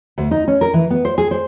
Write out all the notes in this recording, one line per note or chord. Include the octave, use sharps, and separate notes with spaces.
D2
D#4
C#4
A#4
E3
B3
C5
G#4
C5